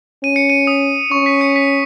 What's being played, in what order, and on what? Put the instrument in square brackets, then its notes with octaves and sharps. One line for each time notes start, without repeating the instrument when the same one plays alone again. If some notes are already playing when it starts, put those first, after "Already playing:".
[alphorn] C#4 [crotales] D#7
[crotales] C#7
D#7
D#6
[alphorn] C#4 [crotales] C#6
[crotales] B6
C#7
B6